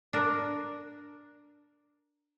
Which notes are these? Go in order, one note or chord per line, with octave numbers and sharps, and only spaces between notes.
D4 A#4